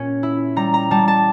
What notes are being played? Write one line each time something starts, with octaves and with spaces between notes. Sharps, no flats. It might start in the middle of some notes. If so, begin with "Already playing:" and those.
Already playing: A#2 C#4
E4
G3 A#5
A#5
G3 A5
A5